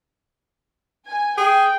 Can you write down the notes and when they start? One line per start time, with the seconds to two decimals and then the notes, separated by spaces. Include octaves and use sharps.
1.06 G#5
1.37 G#4 G5